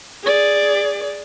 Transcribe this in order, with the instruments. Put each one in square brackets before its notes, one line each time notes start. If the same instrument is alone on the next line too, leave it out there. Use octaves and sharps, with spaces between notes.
[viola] G#4 D5